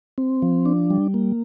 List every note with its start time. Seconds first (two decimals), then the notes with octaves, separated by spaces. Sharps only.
0.18 C4
0.42 F3
0.66 D4
0.90 G3
1.14 A#3